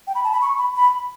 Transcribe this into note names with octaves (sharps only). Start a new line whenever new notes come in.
G5
B5
A5
B5
C#6
B5
B5